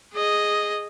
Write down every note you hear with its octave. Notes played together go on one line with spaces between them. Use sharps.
G#4 D#5